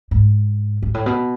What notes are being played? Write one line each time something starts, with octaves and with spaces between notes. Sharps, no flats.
G#2
G#2
A2
B2